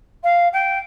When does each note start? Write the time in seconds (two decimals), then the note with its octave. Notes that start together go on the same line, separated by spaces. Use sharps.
0.23 F5
0.53 G5